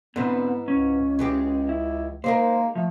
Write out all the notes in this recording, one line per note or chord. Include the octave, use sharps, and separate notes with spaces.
G#2 D3 E3 B3 C4 B4
C#2 C#4
E3 G#3 G4
E4
G#3 A#3 D#4 A#4 C5
F3 A3